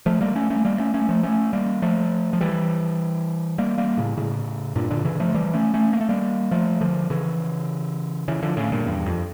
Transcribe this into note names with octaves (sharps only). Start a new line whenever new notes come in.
F3 A3
G3 A#3
A3 C#4
A3 C#4
G3 A#3
A3 C#4
A3 C#4
F3 A3
A3 C#4
G3 A#3
F3 A3
F3
E3 G3
G3 A#3
G3 A#3
A2 C#3
A2 C#3
G2 A#2
A#2 D3
C#3 E3
F3 A3
E3 G3
A3 C#4
A3 C#4
A#3
A3
G3 A#3
F3 A3
D3 F3
C#3 E3
C#3 E3
D3 F3
A2 C#3
G2 A#2
E2 G2
F2